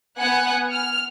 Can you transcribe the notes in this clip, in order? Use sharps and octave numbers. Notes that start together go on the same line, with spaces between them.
B3 F#5 G#5
F6